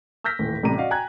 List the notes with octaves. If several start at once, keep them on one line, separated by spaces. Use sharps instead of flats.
E6 F6 G6 A#6 B6
D#1 A2 E3
A1 A2 C3 G3 A#5 D#7
F#4 D5 D#5 F5 F#5
G5 G#5 A#5 F#6 G#6